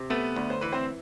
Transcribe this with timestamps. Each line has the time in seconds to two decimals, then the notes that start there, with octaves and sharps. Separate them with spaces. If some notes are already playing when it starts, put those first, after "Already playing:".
Already playing: C3
0.10 A3 B3 B4
0.36 D2
0.50 C5
0.61 E3 B4
0.72 C4 C5